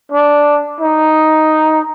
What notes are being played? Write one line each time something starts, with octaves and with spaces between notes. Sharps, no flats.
D4
D#4